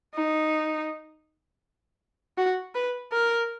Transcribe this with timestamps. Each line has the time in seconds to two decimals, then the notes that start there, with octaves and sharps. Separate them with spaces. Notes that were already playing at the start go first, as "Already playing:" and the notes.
0.14 D#4
2.38 F#4
2.75 B4
3.12 A#4